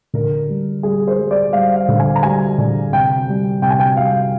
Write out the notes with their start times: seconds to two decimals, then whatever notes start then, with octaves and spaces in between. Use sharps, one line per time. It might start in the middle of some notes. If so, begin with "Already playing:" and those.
0.14 D3 A#4
0.49 G3
0.83 G3 G#4
1.08 C5
1.19 G3
1.31 D5
1.53 G3 F5
1.76 F5
1.89 D3
1.99 G#5
2.16 A#5
2.23 G3 G#5
2.59 D3
2.92 C3 G5
3.28 G3
3.62 C3 G5
3.70 G#5
3.80 G5
3.97 G3 F5